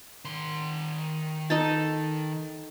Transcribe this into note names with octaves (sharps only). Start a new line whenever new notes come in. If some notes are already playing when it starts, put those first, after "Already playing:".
D#3 C6
D#4 A4 A5